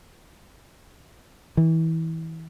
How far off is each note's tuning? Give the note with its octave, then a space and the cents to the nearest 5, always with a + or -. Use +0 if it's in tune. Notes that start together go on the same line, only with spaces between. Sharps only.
E3 -25